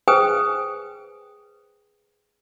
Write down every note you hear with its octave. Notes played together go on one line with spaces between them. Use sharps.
G#4 B4 C5 G5 G#5 D#6